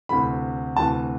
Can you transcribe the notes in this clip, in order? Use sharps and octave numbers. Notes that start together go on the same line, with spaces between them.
D2 C3 E3 A3 B5
D2 C3 E3 A3 A5